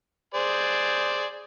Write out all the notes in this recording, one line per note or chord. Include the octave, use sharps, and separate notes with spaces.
G#4 C5 D5